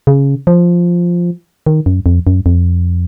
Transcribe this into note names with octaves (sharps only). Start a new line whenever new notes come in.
C#3
F3
D#3
F#2
F2
F#2
F2